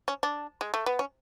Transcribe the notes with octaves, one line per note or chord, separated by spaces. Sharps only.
C#4
D4
G#3
A3
B3
C#4